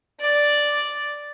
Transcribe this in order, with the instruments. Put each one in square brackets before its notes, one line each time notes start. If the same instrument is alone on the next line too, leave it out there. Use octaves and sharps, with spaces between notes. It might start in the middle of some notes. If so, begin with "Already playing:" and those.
[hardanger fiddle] D5